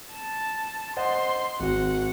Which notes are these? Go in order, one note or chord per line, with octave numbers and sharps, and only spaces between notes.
A5
C5 D#5 F#5 C6
G#1 F#4 F#5